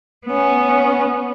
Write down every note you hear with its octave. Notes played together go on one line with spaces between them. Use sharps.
B3 C#4